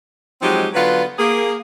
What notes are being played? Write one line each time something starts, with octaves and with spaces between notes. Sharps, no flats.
F3 F#3 G#3 C4 D#4 G4
D3 F#3 B3 F4 B4
A#3 G#4